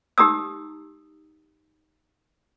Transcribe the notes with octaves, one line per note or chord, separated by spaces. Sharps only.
D#4 G4 A#5 D#6 E6